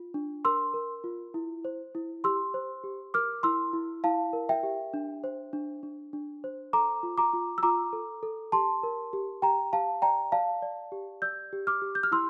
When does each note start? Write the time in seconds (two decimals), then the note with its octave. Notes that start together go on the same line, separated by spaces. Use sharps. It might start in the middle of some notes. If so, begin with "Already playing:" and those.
Already playing: F4
0.14 D4
0.45 A#4 C6 E6
0.74 A#4
1.04 F4
1.34 E4
1.65 C5
1.95 E4
2.24 G4 C6 E6
2.54 C5
2.83 G4
3.14 A#4 D6 F6
3.43 E4 C6 E6
3.73 E4
4.04 E4 F5 A5
4.33 A#4
4.49 E5 G5
4.63 G4
4.94 D4
5.24 C5
5.53 D4
5.83 D4
6.13 D4
6.44 C5
6.73 A4 A#5 D6
7.03 F4
7.18 A#5 D6
7.33 F4
7.58 E6
7.63 F4 A#5 D6
7.93 A4
8.23 A4
8.52 G4 A5 C6
8.83 A#4
9.13 G4
9.42 G4 G5 A#5
9.73 G4 F5 A5
10.02 D5 G5 A#5
10.32 D5 F5 A5
10.62 D5
10.92 G4
11.22 D5 E6 G6
11.53 G4
11.67 D6 F6
11.82 G4
11.95 G6
12.03 F6
12.12 E4 C6 E6